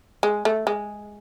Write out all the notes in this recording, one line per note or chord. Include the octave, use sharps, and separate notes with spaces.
G#3
A3
G#3